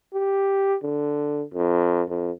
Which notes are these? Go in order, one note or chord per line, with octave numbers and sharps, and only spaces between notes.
G4
D3
F2
F2